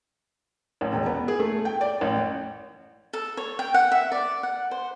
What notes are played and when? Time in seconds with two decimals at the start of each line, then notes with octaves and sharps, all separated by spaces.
0.81 A1
0.92 E1
1.06 B3
1.28 G#4
1.39 A3
1.65 G5
1.81 D5
2.01 A1
3.13 A4
3.37 C#5
3.59 G5
3.74 F#5
3.91 E5
4.12 D5
4.43 F#5
4.71 C5